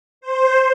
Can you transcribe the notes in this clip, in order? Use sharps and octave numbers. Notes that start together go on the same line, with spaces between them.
C5